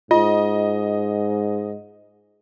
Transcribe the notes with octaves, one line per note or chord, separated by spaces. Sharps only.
G#2 F4 D#5